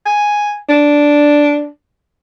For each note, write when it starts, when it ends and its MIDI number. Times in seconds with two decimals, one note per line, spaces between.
0.06 0.56 80
0.69 1.67 62